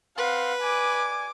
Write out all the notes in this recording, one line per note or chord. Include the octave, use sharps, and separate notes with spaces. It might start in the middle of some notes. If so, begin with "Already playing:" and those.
C4 B4 F5 F#5 C6
D5 G#5 D6